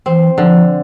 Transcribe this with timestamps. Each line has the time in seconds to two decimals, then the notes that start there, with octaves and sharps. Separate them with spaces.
0.06 E3 C4
0.38 D3 F3